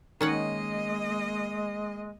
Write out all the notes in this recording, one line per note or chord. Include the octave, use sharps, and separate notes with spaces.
D#3 G#3 A#3 C#4 D#5 F#5